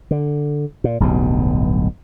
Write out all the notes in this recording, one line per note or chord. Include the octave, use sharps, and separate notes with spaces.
D3
A#2
D1 B1 G2 B2